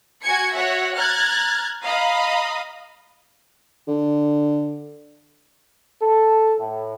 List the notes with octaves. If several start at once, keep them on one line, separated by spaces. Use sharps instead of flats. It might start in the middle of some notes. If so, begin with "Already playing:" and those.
F#4 G#5 G#6 C#7
F#4 C#5 E5 F#5
A#5 F6 F#6 G#6 A6
D#5 F5 A#5 B5 D#6
D3
A4
A2